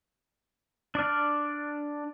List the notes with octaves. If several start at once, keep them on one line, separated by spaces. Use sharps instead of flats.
D4 D5 F6